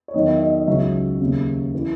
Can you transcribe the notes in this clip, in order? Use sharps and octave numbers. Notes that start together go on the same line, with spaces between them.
C#5
E2 D#3 F#3 D#5
E5
D#5
D#5
C#2 C#3 F#3 E5
D#2 C#3 F#3
E3